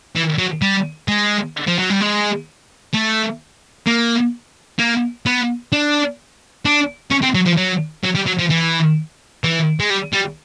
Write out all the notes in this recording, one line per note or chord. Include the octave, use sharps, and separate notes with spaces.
E3
F#3
G3
G#3
F3
F#3
G3
G#3
A3
A#3
A#3
B3
D4
D4
C#4
C4
F#3
F3
F#3
F#3
G3
F#3
F3
E3
E3
G#3
G3
G3